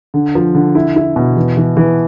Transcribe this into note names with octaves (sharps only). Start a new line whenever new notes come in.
D3
F3
D3
E4
E4
B2
E3
E3
E3